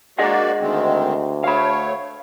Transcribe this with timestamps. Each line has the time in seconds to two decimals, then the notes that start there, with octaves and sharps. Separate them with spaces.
0.19 A#3 F#4 G#4 D5 D#5 F#5
0.61 D2 D#3 G#3 C4
1.44 A3 C#5 F5 B5